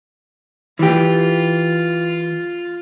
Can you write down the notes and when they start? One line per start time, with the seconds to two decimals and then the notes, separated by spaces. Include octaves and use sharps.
0.79 E3 F4 G4